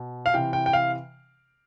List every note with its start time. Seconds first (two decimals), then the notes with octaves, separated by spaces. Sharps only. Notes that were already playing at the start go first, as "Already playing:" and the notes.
Already playing: B2
0.26 F5
0.34 C3 E3 G5
0.53 G5
0.66 G5
0.73 F5